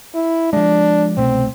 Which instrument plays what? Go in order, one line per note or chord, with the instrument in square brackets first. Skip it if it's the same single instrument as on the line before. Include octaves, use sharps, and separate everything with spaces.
[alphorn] E4
[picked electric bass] F3 G#3 [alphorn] D4
[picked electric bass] C2 B2 A3 [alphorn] C4